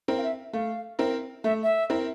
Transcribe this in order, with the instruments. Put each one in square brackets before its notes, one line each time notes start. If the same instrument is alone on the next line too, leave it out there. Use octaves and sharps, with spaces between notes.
[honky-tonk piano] C4 E4 A#4
[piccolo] F5
E5
[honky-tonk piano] A3 [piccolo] F5
[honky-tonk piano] C4 E4 A#4
[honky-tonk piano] A3 [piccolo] E5
[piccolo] E5
[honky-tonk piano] C4 E4 A#4